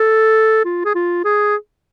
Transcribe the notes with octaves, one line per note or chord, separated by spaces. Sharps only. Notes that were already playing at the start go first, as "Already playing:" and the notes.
Already playing: A4
F4
G#4
F4
G#4